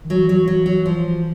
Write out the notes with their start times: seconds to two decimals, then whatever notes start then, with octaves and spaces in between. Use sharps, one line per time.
0.04 D#3
0.10 E3 F#3
0.29 F#3
0.48 F#3
0.66 F#3
0.86 F3